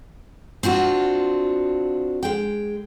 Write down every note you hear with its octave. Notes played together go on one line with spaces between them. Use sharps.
C4 D4 F4 F#4
G#3 G5